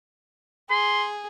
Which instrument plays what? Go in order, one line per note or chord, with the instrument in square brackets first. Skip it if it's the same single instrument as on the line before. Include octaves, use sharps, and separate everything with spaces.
[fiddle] G#4 [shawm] C6